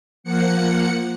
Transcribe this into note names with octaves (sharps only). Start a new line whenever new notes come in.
F3 A#3 F#5 C#7